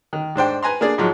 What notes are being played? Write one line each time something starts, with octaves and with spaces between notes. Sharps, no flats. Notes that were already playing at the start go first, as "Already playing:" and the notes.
D#3
G#2 D4 C5 G5
B4 G#5 A#5 C6
A#3 D4 G#4 D5
G#2 F3 F#3 G#3